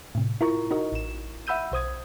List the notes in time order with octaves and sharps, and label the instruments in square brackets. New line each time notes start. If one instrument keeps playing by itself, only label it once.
[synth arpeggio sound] A2 C3
E4 F4 A#4 A#5 C#6
D#4 F#4 A#4 D#5
A1 E7
E5 F#5 B5 E6 G6 D#7
B1 C5 D#6 G#6